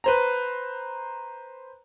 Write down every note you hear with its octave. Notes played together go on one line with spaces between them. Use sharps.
B4 C5 A#5